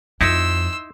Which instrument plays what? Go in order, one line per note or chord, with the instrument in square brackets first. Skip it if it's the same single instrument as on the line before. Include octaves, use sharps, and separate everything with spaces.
[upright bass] F2 [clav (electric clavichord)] D#4 E4 [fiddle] C6 E6